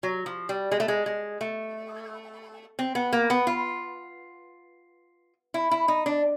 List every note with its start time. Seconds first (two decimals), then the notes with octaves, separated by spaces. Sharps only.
0.03 F#3
0.26 F3
0.49 G3
0.72 G#3
0.80 A3
0.88 G#3
1.06 G#3
1.41 A3
2.79 C4
2.95 B3
3.13 A#3
3.30 B3
3.47 F4
5.54 E4
5.71 E4
5.88 D#4
6.06 D4